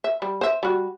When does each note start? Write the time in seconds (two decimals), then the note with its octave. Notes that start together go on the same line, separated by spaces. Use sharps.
0.04 E5
0.22 G3
0.41 C5 E5
0.63 G3 F#4